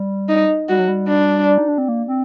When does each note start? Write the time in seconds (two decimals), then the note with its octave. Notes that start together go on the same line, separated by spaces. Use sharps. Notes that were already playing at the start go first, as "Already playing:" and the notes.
Already playing: G3
0.29 D#4
0.69 G3 F#4
0.79 F#3
0.88 G3
1.08 D4
1.58 D#4
1.68 D4
1.78 C4
1.88 A#3
2.08 C4